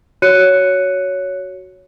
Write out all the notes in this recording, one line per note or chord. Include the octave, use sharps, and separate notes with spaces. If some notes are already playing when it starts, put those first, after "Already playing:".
F#4 C#5 F#6 C#7 D#7